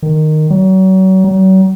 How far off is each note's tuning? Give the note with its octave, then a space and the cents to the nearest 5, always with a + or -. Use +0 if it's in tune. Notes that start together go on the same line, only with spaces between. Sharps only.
D#3 -10
F#3 +35
F#3 +40